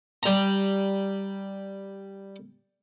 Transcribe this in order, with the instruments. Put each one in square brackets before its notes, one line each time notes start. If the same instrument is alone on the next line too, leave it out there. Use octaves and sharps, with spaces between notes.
[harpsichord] G3 A#5